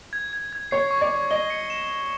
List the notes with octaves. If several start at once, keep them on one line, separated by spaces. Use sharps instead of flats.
G#6
G#6
G#6
C#5 C7
C#6
D5
C#6
D#5 G7
C#7
E7
E7